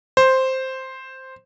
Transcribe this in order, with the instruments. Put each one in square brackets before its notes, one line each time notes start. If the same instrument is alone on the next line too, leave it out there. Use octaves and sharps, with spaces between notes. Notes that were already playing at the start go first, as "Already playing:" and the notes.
[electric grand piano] C5